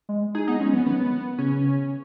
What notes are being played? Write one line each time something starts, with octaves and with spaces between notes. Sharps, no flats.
G#3
D#4 G#4
B3 D#4
G#3 C#4
F#3 B3
D#3 B3
C#3 C#4